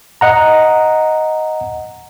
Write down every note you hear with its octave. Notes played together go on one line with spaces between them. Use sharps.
D#5 F#5 A#5